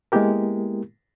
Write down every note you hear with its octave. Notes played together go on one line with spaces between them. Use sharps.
G#3 A#3 B3 E4 G4 A#4